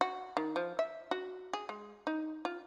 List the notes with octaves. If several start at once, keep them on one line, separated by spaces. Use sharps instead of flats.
F#4
D#3
F3
E5
F#4
G#4
G#3
D#4
F4